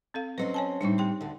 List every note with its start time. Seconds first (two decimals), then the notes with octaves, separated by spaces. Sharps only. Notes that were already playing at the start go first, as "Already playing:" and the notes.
0.14 C4 A4 F5
0.38 F#3 C4 C#4 B4 D#5
0.54 C#5 G#5 A5
0.81 A2 G3 C4 D4 D#4
0.98 G4 G5 C6
1.21 D2 D3